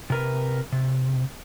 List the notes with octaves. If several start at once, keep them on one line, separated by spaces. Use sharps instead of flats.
C3 A#4 B4
C3